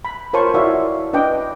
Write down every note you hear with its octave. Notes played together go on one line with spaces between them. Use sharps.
B5
F4 A#4 C5 C#5 A5 C#6
E4 F#4 C#5 D5 E5 F5
D4 B4 D#5 G5 D6